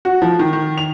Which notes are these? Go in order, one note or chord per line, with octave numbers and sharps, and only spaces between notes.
F#4
F3
D#3
D#3
F7